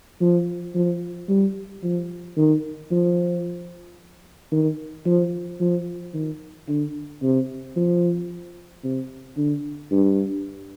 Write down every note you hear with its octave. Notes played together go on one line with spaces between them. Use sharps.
F3
F3
G3
F3
D#3
F3
D#3
F3
F3
D#3
D3
C3
F3
C3
D3
G2